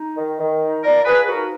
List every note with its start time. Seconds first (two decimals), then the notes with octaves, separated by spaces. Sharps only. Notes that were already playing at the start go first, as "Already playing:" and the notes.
Already playing: D#4
0.16 D#3
0.39 D#3
0.61 D#4
0.83 F3 A#4 D5
1.05 F3 G#4 B4
1.28 D#4 F#4 A#4